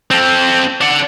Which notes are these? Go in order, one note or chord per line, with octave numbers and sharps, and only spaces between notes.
C4 A4
D4 F#5